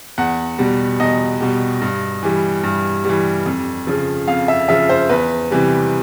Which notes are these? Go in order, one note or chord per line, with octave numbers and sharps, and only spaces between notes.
E2 F#5
B2 G3
E2 D#5
B2 G3
G2
E3 G3
G2
E3 G3
F2
C#3 F3
F2 F5
E5
C#3 F3 E5
C5
E2 B4
C3 E3 G3